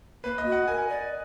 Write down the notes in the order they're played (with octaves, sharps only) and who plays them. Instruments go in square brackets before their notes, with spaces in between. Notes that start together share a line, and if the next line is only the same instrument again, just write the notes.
[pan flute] A#3 [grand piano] B4
[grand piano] D#5
[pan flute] F#4
[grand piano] F#5
[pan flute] A#4 [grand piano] G#5
[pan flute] D5